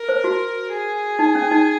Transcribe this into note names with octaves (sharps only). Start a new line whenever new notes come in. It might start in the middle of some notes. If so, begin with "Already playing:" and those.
Already playing: A#4
C5
F#4
G#4
D#4
C#4
D#4